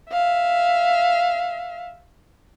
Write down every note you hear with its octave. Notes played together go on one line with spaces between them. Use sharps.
E5 F5